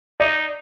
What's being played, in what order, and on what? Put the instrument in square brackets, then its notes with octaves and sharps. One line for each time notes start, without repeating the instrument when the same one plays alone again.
[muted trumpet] D#4 [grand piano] D5